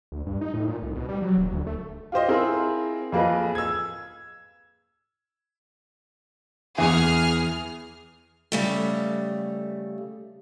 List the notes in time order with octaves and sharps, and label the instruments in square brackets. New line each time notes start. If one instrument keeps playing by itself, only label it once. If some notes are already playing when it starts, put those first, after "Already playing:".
[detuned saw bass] D2
G2
D#4
A2
A#2
C2
B2
G3
F#3
D#1
D2
A3
[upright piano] F4 G4 C5 D#5
C4 E4 F4 G#4 A#4
F2 A#3 G#4 B4 D#5
E6 G#6
[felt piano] E2 E3 [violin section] G#4 F6
[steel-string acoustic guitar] C#3 G3 A3